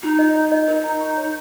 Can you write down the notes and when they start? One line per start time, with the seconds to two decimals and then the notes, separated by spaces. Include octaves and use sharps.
0.03 D#4 F4
0.19 D#5
0.36 D#5
0.52 D#5
0.67 D#4 A#4
0.84 A#5
1.00 C#6
1.17 C#5